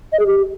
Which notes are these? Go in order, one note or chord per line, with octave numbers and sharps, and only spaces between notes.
D#5
G#4
G4